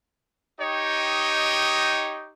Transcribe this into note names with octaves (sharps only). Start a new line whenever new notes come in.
D#4 G4 C#5 D#5 G5